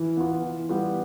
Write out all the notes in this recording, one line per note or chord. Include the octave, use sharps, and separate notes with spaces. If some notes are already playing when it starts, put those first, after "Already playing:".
Already playing: E3
B3 F4
E3
G3 B3 F4 B4